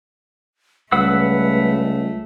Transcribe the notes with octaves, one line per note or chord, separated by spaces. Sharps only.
C#2 G3 A3 B4 F#5 E6